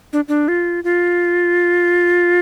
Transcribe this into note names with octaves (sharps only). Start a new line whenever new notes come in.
D4
D4
F4
F4